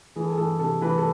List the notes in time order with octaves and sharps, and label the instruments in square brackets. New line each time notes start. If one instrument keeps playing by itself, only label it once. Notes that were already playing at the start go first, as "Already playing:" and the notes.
[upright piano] E3 G#4
A4
G#4
E3 A4
C3 A4
E3 B4
A4